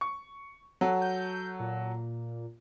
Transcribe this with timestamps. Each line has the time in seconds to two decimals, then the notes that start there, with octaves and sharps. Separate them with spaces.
0.01 C#6
0.81 F#3 F#4 A4
1.02 G6
1.60 A#2